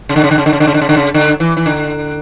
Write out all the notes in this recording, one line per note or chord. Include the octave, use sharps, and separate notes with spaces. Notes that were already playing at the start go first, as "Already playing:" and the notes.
C#3
D3
C#3
D3
C#3
D3
C#3
D3
C#3
D3
C#3
D3
C#3
D3
E3
E3
D3